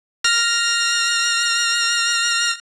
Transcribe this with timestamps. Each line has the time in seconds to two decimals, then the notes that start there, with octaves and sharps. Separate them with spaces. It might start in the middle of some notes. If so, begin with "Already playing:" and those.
0.24 F6 A#6